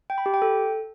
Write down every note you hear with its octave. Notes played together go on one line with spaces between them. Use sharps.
G5
B5
G4
G5
A4